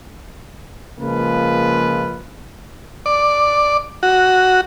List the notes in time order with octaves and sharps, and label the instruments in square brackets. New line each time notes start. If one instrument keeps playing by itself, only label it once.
[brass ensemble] C#3 F3 G#3 A#3 F4 B4
[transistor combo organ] D5
F#4